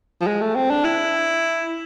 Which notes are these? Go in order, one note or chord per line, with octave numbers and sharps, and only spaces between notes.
F3
G#3
A3
C4
D4
E4